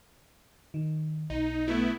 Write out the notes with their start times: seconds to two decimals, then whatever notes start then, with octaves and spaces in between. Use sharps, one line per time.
0.74 D#3
1.30 B1 D#4
1.68 A3 B3 E4